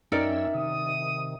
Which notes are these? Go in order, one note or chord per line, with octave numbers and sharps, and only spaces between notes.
F#2 C#4 D#4 A#4 D5 E5 G5 E6
C3 D#3 D#6